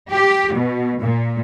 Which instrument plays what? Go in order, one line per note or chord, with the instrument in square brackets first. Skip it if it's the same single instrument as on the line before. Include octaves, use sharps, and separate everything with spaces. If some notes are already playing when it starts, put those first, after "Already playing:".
[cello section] G4
B2
A#2